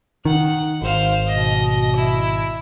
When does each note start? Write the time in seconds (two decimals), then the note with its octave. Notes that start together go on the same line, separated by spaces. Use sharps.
0.25 D#3 F#5
0.82 G#1 C5 F5
1.28 B2 D#5
1.96 E4